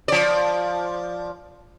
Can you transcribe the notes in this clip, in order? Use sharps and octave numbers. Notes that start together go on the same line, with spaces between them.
F3 D5